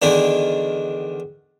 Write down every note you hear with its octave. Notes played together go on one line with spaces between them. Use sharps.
E2 D3 D#3 D4